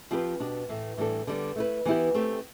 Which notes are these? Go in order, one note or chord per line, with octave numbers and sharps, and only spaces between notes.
F3 C4 G4 B4
B2 B3 D4 G4
A2 E3 A3
A2 E3 G3 D4 A4
D3 G3 B3
A3 E4 B4
E3 B3 E4 G4
A3 C4 G4